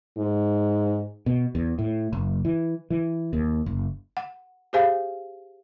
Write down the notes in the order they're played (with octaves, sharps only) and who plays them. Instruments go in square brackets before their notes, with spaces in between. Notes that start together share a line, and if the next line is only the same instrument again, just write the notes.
[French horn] G#2
[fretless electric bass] B2
E2
A2
F#1
E3
E3
D#2
F#1
[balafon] F#5
G4 G#4 C5 F5 G#5